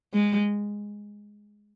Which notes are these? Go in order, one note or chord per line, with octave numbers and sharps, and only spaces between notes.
G#3